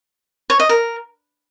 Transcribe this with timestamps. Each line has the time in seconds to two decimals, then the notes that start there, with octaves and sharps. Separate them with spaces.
0.50 C#5
0.60 D#5
0.69 A#4